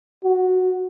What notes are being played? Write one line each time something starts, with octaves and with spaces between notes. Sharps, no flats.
F#4